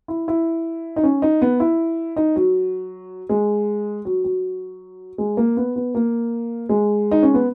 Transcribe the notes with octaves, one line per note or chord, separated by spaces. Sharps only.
E4
E4
D#4
C#4
D#4
B3
E4
D#4
F#3
G#3
F#3
F#3
G#3
A#3
B3
B3
A#3
G#3
D#4
C#4
B3